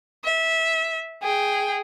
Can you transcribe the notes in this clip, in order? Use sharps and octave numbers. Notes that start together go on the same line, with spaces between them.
E5
G#4 G5